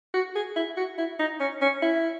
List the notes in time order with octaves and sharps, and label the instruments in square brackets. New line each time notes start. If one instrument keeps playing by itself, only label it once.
[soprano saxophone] F#4
G#4
E4
F#4
E4
D#4
C#4
C#4
E4